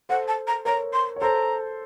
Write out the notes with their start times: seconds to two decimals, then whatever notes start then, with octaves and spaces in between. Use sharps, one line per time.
0.09 A4 C5 F#5
0.28 A5
0.47 A#5
0.65 A#4 C#5 A#5
0.93 C6
1.16 C#5
1.21 A4 C5 A#5